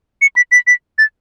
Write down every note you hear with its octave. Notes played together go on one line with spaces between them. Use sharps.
C#7
B6
B6
B6
A6